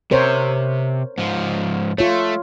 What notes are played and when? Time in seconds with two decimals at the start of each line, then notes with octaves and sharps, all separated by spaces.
0.11 C3 A#4 C5 C#5
1.18 G#2 F3
1.98 A3 F4 C#5